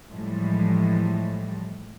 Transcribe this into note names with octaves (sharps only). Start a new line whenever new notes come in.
A2 E3 F3 G3 G#3